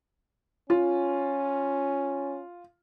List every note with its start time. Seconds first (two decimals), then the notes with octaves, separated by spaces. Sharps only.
0.70 C#4 F4